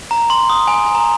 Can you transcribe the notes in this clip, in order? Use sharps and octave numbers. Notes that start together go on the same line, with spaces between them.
A#5
C6
D#6
G#5
G#5
A#5